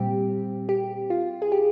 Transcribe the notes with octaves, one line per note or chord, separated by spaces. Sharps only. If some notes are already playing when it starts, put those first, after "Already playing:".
Already playing: A#2 G3 C4 G4
G4
F4
G#4
G4